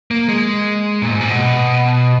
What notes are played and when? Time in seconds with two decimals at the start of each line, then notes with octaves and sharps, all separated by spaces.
0.11 A#3
0.29 G#3
1.02 A#2
1.11 G#2
1.21 A#2
1.29 B2